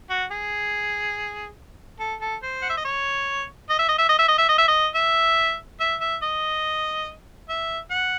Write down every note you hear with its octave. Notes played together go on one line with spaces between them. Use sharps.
F#4
G#4
A4
A4
C5
F#5
E5
D#5
C#5
D#5
E5
D#5
E5
D#5
E5
D#5
E5
D#5
E5
D#5
E5
E5
E5
D#5
E5
F#5